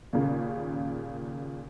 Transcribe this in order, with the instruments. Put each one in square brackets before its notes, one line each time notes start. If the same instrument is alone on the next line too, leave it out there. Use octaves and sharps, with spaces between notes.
[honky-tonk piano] D#2 A#2 C#3